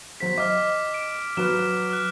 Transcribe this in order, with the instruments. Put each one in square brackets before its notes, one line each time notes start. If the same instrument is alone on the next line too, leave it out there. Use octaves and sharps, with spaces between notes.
[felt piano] F#3 C5 [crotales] B6
[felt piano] D#5 [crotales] D6 F6
[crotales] D7
[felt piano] F#3 F#4 B4 [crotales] F6 E7
[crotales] F6 F#6